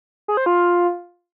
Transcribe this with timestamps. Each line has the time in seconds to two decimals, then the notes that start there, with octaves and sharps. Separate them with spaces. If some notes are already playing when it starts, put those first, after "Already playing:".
0.28 G#4
0.37 C5
0.46 F4